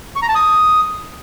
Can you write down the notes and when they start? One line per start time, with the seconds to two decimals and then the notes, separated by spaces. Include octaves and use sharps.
0.16 C#6
0.22 A#5
0.29 A5
0.35 D#6